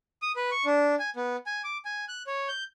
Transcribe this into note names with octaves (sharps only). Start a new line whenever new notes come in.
D#6
B4
C#6
D4
G#5
B3
G#5
D6
G#5
F#6
C#5
G6